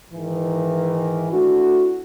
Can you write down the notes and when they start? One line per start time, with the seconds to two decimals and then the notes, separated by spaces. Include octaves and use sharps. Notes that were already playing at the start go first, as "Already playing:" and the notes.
0.13 G#2 D#3 E3
1.31 A3 D4 E4 F#4